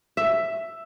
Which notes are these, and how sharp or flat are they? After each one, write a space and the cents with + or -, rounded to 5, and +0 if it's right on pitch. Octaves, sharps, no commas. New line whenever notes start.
E5 +5